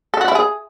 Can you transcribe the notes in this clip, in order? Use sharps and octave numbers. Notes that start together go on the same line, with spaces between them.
A4
F#4
E4
G#4